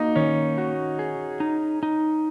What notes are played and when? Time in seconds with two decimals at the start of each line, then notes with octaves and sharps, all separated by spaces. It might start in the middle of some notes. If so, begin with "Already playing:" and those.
Already playing: A#3 D#4 F#4
0.16 D#3 C#4
0.58 F#4
0.99 G#4
1.40 D#4
1.83 D#4